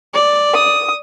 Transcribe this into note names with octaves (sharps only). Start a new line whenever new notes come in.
D5
D#6